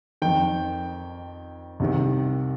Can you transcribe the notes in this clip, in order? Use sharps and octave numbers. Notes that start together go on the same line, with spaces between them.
F2 D#3 G5
C2 C3 D#3